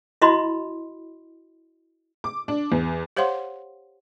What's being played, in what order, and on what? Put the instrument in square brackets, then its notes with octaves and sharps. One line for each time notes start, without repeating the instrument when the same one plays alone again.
[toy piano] E4 F#4 D#5 B5 C6
[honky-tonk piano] D6
D4
E2
[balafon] G4 C5 C#5 F5 F#5 C6